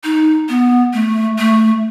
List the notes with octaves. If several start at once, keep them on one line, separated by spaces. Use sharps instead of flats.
D#4
B3
A3
A3